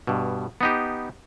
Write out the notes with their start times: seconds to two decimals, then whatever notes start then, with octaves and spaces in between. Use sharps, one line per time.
0.07 G2 B2
0.61 B3 D#4 G4